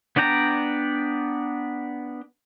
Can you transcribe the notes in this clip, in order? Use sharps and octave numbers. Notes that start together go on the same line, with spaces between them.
B3 D4 D5 G5 A#5